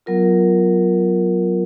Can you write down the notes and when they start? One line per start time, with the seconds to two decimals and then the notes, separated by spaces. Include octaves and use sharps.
0.06 F#3 B3 F4 A#4